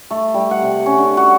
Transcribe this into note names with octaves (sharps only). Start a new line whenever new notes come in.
A3
G3
F#5
C3
C#4
D3
F#4